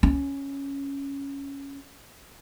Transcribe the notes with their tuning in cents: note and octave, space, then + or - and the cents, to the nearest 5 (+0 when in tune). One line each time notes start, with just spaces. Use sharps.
C#4 +0